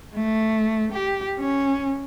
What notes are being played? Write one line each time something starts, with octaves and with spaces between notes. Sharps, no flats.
A3
G4
C#4